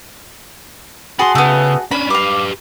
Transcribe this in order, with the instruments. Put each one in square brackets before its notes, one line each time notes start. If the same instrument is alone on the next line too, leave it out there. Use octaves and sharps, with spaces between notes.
[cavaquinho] F#4 G#4 A5 [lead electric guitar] B5 C6
[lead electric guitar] C#3 [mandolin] A3 B3
[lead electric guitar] C#4 D4 [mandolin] B5
[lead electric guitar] G4 B4 [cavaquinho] F5 D6